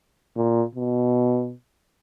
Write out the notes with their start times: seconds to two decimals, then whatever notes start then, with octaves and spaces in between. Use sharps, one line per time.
0.37 A#2
0.75 B2